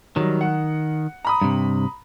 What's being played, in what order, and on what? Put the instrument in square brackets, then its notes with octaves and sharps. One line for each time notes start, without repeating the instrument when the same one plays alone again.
[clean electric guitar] D#3 [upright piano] F#3 G3
[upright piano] F#5
A#5 B5 D#6
[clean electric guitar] G2 C3